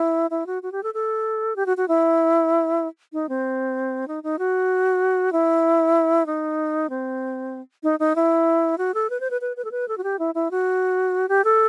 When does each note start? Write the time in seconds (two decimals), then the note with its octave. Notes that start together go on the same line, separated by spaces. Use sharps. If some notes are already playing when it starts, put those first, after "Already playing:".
Already playing: E4
0.30 E4
0.46 F#4
0.63 F#4
0.72 G4
0.83 A4
0.94 A4
1.56 G4
1.66 F#4
1.77 F#4
1.88 E4
3.13 D#4
3.29 C4
4.08 D#4
4.23 D#4
4.39 F#4
5.32 E4
6.26 D#4
6.90 C4
7.83 D#4
7.99 D#4
8.16 E4
8.78 F#4
8.94 A4
9.10 B4
9.20 C5
9.30 B4
9.41 B4
9.57 B4
9.65 A4
9.71 B4
9.88 A4
9.98 F#4
10.04 G4
10.19 E4
10.35 E4
10.51 F#4
11.29 G4
11.44 A4